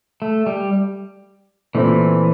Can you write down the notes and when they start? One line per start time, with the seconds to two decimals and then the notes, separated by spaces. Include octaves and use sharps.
0.22 A3
0.47 G3
1.74 A#2 E3 A3 C4 E4